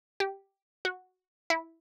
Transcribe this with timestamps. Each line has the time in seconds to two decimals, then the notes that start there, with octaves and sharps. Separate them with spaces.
0.20 G4
0.85 F#4
1.50 E4